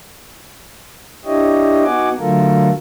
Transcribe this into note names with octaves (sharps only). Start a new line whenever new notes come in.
D4 E4 G4 C#5 D#5
B3 D#4 F#4 F#5 G#5 D6
D3 F#3 A3 F4 A4 A#4